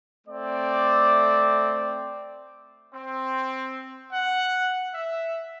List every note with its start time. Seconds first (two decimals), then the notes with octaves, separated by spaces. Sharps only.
0.27 A3 C4 D5
2.93 C4
4.11 F#5
4.93 E5